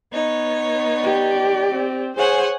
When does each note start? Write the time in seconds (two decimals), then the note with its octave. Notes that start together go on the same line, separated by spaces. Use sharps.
0.12 B3 D#4 C#5
0.99 G4 D5
1.70 C4
2.17 G#4 C5 C#5 F#5 G#5